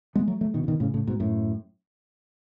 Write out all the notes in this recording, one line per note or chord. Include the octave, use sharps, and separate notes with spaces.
G#3 B3
F#3 A3
F#3 A3
B2 D#3
C#3
B2 D#3
A2 C#3
A2 C#3
G#2 B2
F#2 A2